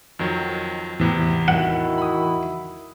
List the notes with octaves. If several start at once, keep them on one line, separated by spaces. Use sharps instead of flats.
F2 D#3 F#3
G#1 E2 A2 C3 E3 B3
D#3 E4 F#4 F#5
B5 D#6